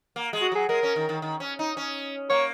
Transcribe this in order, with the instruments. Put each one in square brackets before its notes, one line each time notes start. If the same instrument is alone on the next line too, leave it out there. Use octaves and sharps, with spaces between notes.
[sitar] A#3
G#3
[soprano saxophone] F#4
[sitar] F#3 [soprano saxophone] G#4
[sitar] G#3 [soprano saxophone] A#4
[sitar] C#4
D#3
D#3
D#3
C#4
D#4
C#4
[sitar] A#3 [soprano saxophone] C#5